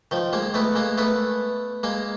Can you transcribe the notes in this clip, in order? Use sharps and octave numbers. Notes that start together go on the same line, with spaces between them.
D#3 F3
G#3 A#3
A3 B3
G#3 A#3
A3 B3
G#3 A#3